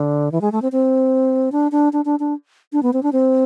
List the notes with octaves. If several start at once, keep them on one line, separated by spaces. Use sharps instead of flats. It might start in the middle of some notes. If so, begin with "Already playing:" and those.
Already playing: D3
E3
G#3
A3
C4
C4
D4
D4
D4
D4
D4
D4
B3
C4
D4
C4